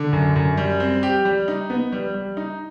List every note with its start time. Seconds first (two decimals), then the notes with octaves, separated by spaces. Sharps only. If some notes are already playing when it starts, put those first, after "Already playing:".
Already playing: D3
0.13 F#2
0.36 F#2
0.57 G3
0.80 C4
1.03 G4
1.25 G3
1.48 D#4
1.70 B3
1.92 G3
2.15 G3
2.37 D#4